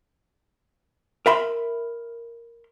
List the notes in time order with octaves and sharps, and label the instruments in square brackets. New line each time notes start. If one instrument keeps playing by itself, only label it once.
[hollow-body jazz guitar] A#4 E5 B5 C6